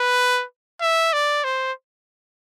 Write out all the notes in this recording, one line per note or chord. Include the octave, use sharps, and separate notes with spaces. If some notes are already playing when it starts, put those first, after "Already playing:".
Already playing: B4
E5
D5
C5